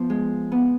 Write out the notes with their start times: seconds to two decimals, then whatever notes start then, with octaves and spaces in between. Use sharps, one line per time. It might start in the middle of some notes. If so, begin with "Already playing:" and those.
Already playing: F3 B3
0.10 G#3
0.52 B3